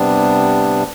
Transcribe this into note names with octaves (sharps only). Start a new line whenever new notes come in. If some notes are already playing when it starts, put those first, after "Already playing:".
Already playing: C3 G3 B3 D4